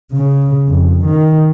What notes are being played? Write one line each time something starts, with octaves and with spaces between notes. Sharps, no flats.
C#3
F2
D#3